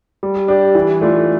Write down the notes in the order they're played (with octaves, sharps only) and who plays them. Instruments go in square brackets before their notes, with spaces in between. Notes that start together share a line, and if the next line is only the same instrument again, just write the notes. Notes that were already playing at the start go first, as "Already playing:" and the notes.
[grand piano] G3
D4 G4
E3
A3 D4 F4